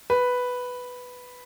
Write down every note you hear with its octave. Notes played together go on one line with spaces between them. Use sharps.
B4